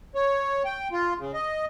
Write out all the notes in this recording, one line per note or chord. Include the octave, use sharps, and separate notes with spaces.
C#5
G5
F4
C#3
D#5